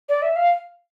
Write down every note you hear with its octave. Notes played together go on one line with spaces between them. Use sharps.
D5
E5
F5